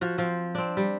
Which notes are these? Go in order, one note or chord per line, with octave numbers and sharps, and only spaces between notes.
F3 F#4
F3 C4
C4 D4
G3